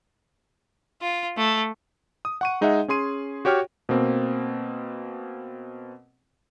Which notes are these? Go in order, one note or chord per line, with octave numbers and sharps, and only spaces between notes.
F4
A3
D#6
F#5 C#6 D#7
G#3 D#4 G#4 D#5 E5 F#5
C#4 G#4 C6 D#7
F#4 G4 C#5 G5 F6
B2 A#3 C4